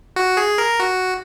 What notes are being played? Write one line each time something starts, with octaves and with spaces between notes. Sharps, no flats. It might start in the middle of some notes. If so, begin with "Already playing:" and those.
F#4
G#4
A#4
F#4